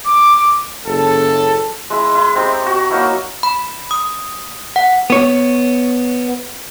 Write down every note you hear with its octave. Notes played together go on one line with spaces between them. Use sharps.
D6
F#1 A4
G#3 E4
E4
C4 D#4 G4 G5
F#4 C#6
F#3 A#3 D#4 E4
B5
D#6
F#5
B3 C#5